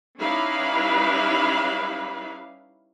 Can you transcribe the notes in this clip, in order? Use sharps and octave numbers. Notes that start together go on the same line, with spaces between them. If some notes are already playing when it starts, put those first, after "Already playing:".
G3 C#4 D#4 E4 B4 F5